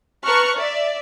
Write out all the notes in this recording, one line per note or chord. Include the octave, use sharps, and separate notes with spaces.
B4 A5 A#5 C#6 F6 F#6
D5 E5